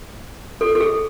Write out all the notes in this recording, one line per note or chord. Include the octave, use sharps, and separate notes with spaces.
A4
A4
G#4